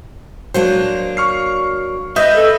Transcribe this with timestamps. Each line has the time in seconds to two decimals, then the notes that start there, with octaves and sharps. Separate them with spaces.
0.54 F#3 A#3 D4 C5
1.17 C#6 F6 C7
2.16 B4 D#5 E5 D#6 G6
2.35 A4